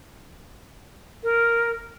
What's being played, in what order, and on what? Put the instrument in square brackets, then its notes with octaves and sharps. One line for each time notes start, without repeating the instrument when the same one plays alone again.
[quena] A#4